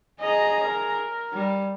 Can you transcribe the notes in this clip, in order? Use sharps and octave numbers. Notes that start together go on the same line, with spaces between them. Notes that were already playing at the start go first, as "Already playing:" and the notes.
G#4 D#5 A#5
A#4
G3